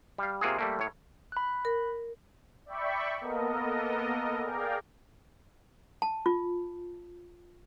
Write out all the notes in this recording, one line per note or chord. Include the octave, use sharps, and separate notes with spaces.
G3 F5
C3 A#3 F4 F#4 G#4
G3 A3 A#3
A2 C#5
B5 F#6
A#4
D5 E5 G5 B5 C#6
A#3 B3 A4 A#4 D#5
G#4 A#4 D5 F5 G5
A5
F4